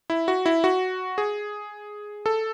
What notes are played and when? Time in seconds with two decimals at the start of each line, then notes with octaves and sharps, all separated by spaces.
0.10 E4
0.28 F#4
0.46 E4
0.64 F#4
1.18 G#4
2.26 A4